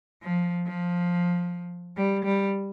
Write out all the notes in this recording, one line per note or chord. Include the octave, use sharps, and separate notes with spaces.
F3
F3
G3
G3